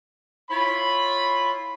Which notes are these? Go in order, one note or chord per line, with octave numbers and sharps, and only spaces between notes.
E4 F4 C#5 B5